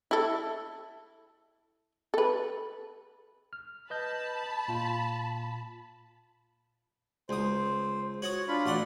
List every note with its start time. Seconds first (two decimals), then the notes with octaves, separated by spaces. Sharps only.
0.11 E4 A4
2.14 A4 B4
3.53 F6
3.90 B4 D#5 A5 B5 G6
4.68 A#2 F4
7.29 C#2 C5 D#6
8.22 F#4 C#5 F#5 D#6
8.48 D4 F4 B5
8.66 A1 F#4 D5 F#5 C6